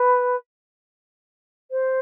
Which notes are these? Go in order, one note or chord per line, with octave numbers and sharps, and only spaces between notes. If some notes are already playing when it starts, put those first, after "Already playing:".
Already playing: B4
C5